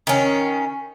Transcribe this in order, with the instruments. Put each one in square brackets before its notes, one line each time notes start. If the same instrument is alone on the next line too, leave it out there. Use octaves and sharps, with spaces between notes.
[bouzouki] D#3 C#4